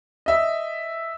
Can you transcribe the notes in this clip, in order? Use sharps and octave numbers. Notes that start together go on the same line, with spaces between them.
D#5 E5